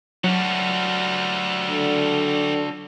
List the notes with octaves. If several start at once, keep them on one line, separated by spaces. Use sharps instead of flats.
E3 F#3 G3 D4 F#4
D3